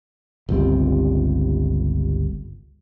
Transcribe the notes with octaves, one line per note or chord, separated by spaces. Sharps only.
G1 C#2 G3 C4